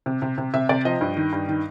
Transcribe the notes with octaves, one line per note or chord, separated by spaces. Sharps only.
C3
C3
C3
C3 E5
C3 D5
F3 D#5
G2
D#3
G2
D#3